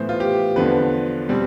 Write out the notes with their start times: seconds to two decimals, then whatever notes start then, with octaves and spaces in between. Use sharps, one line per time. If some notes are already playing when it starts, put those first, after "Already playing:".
Already playing: A2 E3 B3 C5
0.09 F4
0.20 G4
0.56 E2 D3 F3 B4
1.29 B2 G3 C4